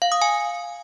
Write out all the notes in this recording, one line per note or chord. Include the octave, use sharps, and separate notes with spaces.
F5
D#6
G#5